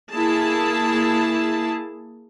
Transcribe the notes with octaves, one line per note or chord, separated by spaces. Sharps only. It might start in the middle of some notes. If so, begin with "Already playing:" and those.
A#3 E4 G#4 A5